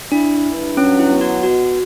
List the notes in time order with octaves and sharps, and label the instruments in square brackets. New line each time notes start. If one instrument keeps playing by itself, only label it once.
[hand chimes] D4 [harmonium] E4
[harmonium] G2
[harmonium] F#3 [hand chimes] C#4
[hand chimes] E4
[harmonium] B3
[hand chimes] F#4
[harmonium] B2 [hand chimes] F#4